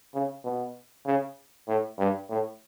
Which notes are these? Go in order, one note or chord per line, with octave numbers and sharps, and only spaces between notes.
C#3
B2
C#3
A2
G2
A2